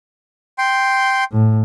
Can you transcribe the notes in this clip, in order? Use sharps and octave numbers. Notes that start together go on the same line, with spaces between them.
G5 C6
A2